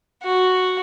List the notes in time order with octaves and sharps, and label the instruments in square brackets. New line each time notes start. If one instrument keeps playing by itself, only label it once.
[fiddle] F#4